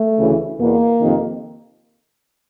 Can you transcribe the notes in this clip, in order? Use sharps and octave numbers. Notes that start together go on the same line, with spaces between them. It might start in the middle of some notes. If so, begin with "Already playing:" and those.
Already playing: A3
D2 C#3 E3
E2 B2 A#3
F2 C3 D#3